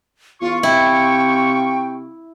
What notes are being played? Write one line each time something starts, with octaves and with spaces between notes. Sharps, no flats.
E2 F4 F5 C#6
C3 E4 G5